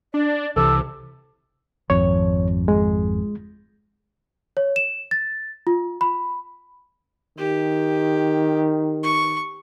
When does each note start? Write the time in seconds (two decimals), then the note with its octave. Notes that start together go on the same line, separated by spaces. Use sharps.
0.14 D4 D5
0.56 C2 C3 E3 A4 D6
1.90 G#1 F2 C#5
2.68 G#3
4.57 C#5
4.76 E7
5.11 A6
5.67 F4
6.01 B5
7.38 D#3 G4
9.03 C#6